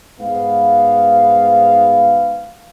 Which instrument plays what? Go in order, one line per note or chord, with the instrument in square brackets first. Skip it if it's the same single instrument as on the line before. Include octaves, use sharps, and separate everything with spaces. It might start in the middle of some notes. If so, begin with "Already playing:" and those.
[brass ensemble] G#2 B3 F5